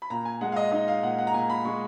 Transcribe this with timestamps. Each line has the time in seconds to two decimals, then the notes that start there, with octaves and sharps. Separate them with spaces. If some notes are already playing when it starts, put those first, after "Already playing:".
0.02 B5
0.10 A#2 A#5
0.25 G#5
0.41 G#3 F#5
0.52 F5
0.56 D#5
0.71 D#4 D#5
0.88 F5
1.03 A#2 F#5
1.18 F#5
1.27 A#5
1.34 A#2 G#5
1.50 B5
1.65 G#3 C#6